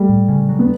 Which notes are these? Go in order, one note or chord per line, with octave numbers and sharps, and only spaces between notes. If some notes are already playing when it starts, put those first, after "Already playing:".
Already playing: G3 A3
A2
C#3
F#3
B3